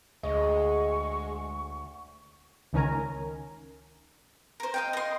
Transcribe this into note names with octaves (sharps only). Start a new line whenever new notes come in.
D2 G#3 D#5 C#6
C#2 D#3 C#4 A#4 G#5 A#5
A#4 C5
D#5 F5 G5
D#5 C6